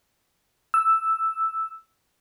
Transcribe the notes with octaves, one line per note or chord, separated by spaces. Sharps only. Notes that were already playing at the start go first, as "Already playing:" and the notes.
E6